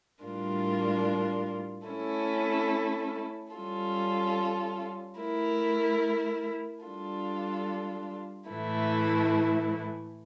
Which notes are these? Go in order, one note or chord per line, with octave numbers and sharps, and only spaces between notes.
A2 G3 D4 F4 A#4
A3 C#4 E4 A4
G3 C#4 F4 A4
A3 E4 A#4
G3 D4 F4 A4
A2 E3 A3 E4